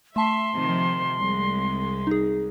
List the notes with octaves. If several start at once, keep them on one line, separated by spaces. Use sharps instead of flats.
A3 E5 A5 C6
C3 D#3 F3
C2 G#3
D#4 G#4